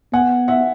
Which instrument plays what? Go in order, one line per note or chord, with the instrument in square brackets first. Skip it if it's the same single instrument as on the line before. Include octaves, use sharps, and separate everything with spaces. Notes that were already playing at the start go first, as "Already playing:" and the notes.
[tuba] B3 [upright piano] F#5 G#5
[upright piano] E5 F#5